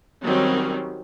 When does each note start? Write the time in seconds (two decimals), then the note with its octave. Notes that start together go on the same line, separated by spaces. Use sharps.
0.22 D#3 F#3 G3 C4 C#4